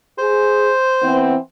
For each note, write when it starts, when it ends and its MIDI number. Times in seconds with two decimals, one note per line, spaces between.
0.19 0.70 68
0.19 1.34 72
1.02 1.34 52
1.02 1.34 59
1.02 1.34 60